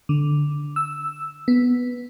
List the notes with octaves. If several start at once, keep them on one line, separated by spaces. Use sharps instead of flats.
D3
E6
B3